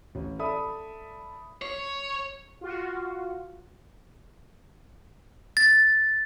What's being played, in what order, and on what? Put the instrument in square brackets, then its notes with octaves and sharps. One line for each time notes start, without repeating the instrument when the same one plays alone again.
[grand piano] A1
A4 D5 E5 B5 D#6
[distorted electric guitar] C#5
[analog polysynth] F4 F#4
[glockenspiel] A6